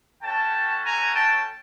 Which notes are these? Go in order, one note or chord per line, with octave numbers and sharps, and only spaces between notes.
A3 C#4 F#4 G5 A5
G#5 A#5
G5 A5